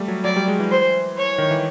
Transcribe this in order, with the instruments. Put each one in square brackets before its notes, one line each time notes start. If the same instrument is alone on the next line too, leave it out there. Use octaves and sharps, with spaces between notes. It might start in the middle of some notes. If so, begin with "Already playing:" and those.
Already playing: [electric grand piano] G3 A3
F#3
[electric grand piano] F#3 [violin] D5
[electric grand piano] G3
G#3
E3
[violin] C5
C#5
[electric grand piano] D#3
E3